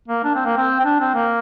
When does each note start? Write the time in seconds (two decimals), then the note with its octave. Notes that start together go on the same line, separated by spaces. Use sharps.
0.08 A#3
0.24 D4
0.35 C4
0.45 A#3
0.57 C4
0.80 C4
0.84 D4
1.00 C4
1.15 A#3